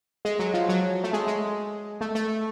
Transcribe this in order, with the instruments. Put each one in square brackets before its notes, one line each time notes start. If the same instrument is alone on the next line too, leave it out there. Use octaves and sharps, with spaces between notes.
[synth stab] G#3
F#3
F3
F#3
A3
G#3
G#3
A3
A3